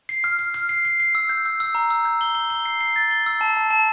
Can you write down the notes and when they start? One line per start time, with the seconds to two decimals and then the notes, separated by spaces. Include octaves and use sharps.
0.09 C7
0.24 F6
0.39 F6
0.54 F6
0.69 C7
0.85 C7
1.00 C7
1.15 E6
1.29 G6
1.46 E6
1.60 E6
1.75 A#5
1.90 E6
2.05 G6
2.21 G7
2.35 G7
2.50 G7
2.65 C7
2.81 C7
2.96 A6
3.11 G7
3.26 E6
3.41 A5
3.57 A5
3.71 A5